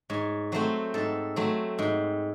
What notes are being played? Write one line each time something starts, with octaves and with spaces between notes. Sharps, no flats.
G#2 C#5
F#3 A3 C4 C5
G#2 A4
F#3 A3 C4
G#2